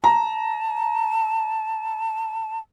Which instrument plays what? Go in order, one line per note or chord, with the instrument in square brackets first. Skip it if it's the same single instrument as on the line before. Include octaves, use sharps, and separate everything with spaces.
[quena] A5 [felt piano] A#5